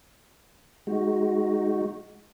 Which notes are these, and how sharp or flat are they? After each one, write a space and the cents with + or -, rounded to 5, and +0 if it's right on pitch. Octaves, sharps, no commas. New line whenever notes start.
G#3 +0 D#4 +0 F#4 +0